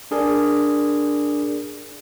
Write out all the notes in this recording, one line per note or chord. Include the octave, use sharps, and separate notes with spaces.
D4 G#4 A#4 D5